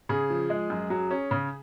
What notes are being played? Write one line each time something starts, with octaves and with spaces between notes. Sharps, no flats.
C#3 G#4
F3
G#3
F#2
F#3
C#4
C#3